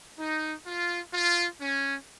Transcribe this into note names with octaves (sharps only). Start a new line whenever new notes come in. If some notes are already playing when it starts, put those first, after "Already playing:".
D#4
F4
F4
C#4